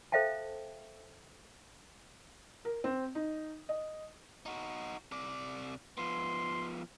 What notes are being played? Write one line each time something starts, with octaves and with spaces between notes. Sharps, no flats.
A4 C5 E5 F5 G5 A5
A#4
C4
D#4
D#5
D#4 F#4
C3 D5
F3 B3 C6